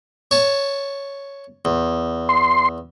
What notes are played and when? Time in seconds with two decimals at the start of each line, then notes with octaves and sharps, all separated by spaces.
0.31 C#5 A5
1.65 E2
2.29 C6